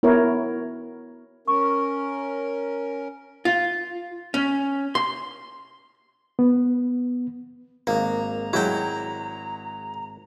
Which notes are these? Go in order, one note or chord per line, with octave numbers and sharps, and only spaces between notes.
B3 E4 A#4 C#5
C#4 A#4 C#6
F4
C#4
C6
B3
G#1 A#3 A#5
F#3 G#3 E4 F#4 G5